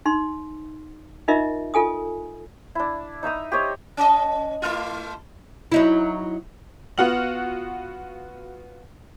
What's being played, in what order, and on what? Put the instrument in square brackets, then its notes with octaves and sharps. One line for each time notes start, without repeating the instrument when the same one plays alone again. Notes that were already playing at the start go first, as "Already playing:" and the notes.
[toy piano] D#4 C6
D#4 F4 A#4 D#5 E5
F4 A4 G#5 D#6
[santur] D4 E4
D#4 E5 A#5 D#6
G4 C5 C#5 D#5
[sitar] C#4 D#5
A3 E4 F4
[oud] F#3 D#4 E4
[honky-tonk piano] B3 F4 F#4 F#5 F6 F#7